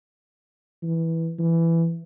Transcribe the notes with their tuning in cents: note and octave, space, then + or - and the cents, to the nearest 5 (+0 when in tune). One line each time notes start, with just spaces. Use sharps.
E3 -5
E3 +10